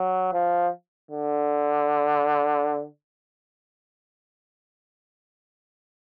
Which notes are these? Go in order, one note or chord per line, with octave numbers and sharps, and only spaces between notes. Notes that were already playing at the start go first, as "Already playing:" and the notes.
Already playing: F#3
F3
D3